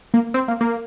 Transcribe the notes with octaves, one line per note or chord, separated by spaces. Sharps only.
A#3
C4
A#3
A#3